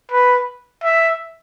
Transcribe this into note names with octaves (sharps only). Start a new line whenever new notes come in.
B4
E5